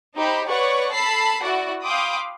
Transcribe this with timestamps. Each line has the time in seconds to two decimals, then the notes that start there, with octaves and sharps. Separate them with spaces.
0.16 D#4 G4 C5 B5
0.48 B4 C#5 D5 F#5 C#6
0.92 A4 A5 B5 B6 C7
1.41 E4 F#4 D5 F#5
1.84 F5 G5 B5 C6 D6 D#6